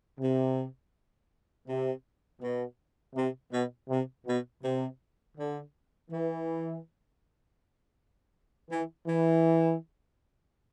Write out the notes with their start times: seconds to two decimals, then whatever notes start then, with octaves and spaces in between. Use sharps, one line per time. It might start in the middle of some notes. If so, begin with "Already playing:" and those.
0.20 C3
1.68 C3
2.41 B2
3.15 C3
3.52 B2
3.89 C3
4.27 B2
4.63 C3
5.38 D3
6.11 E3
8.70 E3
9.07 E3